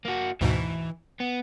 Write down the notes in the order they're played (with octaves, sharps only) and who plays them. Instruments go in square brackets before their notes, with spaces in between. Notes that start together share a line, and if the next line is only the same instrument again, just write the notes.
[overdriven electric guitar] A#3 F#4
[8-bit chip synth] D2 G#2 B2 [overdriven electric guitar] E3
[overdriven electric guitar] B3